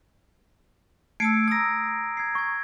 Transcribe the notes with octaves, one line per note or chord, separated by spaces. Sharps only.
A3 A5 E6 G#6 C7 D7
A#5 D#6 E6 A#6
G#6 C7
C#6 G#6